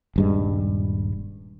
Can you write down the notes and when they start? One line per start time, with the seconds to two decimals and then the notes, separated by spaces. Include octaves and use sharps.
0.16 D#1 G2 G#3